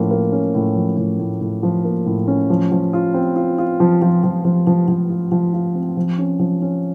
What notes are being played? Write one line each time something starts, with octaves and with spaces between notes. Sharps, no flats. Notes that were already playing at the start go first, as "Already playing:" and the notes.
Already playing: A2 F3 A#3 C#4
A#3
C#4
A2
F3
A2
A2
A2
F3
A#3
A2
C#4
F3
F3
F4
C4
F4
F4
F3
F3
F3
F3
F3
F3
F4
F3
F4
C4
F3
C#4
F3
C#4